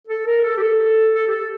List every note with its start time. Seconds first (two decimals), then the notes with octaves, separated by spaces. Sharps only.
0.08 A4
0.26 A#4
0.43 A4
0.57 G4
0.60 A4
1.15 A4
1.28 G4
1.31 A4